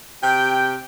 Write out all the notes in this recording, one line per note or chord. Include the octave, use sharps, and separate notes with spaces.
C3 G4 G5